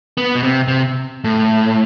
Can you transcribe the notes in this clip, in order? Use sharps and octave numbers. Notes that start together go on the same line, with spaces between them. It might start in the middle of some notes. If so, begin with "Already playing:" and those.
B3
B2
C3
C3
A2